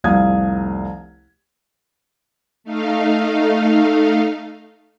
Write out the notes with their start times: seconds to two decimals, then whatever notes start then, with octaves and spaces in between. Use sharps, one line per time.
0.04 F1 C2 F5 D#6 G#6
2.64 A3 D#4 F5